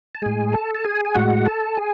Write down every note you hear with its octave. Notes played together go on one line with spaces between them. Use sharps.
A5
A2 G#3 G#4 G#5
A4 A5
A5
G#4 G#5
G#5
A2 G#3 F#4 F#5
A4 A5
G#4 G#5